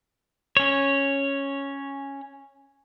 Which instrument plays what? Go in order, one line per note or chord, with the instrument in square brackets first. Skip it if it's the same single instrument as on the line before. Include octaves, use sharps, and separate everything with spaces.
[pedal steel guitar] C#4 C#5